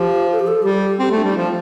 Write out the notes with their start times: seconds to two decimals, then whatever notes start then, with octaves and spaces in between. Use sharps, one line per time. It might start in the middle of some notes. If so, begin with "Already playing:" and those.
Already playing: F3 G4
0.32 A4
0.39 G4
0.47 A4
0.62 G3 G4
0.99 C4 G4
1.11 A3
1.17 D4
1.24 G3
1.35 F3 F4